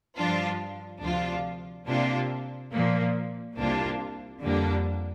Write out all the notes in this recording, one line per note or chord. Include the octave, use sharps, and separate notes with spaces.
G2 F3 D4 F4
D2 C3 F3 D4 F4
C3 A#3 D4 F4
A#2 F3 A#3
C2 C3 A#3 D4 F4
F2 D3 G3 A#3 D4